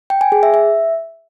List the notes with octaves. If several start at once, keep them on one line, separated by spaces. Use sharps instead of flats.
G5
G#5
G#4
E5
E5